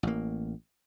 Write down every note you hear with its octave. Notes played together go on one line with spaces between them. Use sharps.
A1 A#3